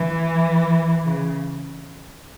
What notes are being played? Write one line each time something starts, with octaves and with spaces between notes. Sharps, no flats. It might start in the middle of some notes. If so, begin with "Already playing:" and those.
Already playing: E3
C#3